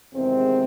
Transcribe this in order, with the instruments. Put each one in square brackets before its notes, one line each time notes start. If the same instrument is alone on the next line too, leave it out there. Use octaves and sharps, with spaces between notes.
[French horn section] E2 C3 D#3 G#3 C4